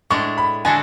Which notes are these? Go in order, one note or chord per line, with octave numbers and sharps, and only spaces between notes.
A2 G#3 D4 C#6
B5
D3 G#3 D4 F#4 A4 G#5